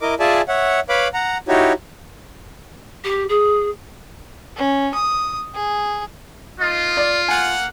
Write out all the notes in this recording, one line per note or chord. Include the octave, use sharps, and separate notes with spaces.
E4 A#4 D#5 D6
F4 G#4 D5 E5 G#5 A5
C#5 E5 F#5
B4 C#5 F5 B5 D6
F#5 A#5
D#4 E4 F#4 G4 C#5
G4
G#4
C#4
D#6
G#4
A#3 D#4 F4 D#5
D5
A#3 F5 F#5 G#5